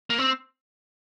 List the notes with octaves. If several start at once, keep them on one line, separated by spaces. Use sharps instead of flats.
A#3
C4